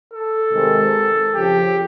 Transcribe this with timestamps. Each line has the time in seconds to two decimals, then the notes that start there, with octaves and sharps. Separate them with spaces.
0.13 A4
0.53 C3 D#3 G#3
1.34 F2 C#3 F3 G4